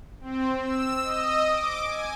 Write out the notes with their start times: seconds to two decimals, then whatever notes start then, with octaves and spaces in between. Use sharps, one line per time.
0.21 C4
0.60 E6
1.03 D#5
1.51 D6
1.84 G#5